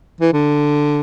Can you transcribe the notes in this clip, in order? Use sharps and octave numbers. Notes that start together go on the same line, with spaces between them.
E3
D3